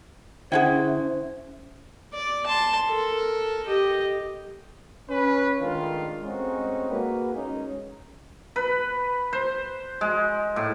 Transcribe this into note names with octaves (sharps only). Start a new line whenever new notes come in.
D3 C#4 E4 G#4 C5 E5 F#5 G5
D5
A5 C6
A4 A#4
G4 D#5
C#4 B4
D#3 G#3 A3 D4 F4
G#3 A3 C4 C#4 D#4 F#4
A#3 F#4 G#4 B4
G#3 C#4 D#4
B4
C5
G#3
A2